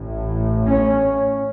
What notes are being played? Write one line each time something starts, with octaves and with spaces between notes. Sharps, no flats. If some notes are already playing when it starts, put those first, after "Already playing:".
Already playing: A1 A2
C#4